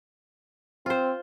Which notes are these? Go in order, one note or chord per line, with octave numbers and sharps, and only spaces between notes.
C4 F4 C5